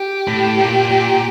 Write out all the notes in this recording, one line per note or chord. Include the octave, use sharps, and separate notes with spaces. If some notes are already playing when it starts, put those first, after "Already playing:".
Already playing: G4
A2
A#2
A#2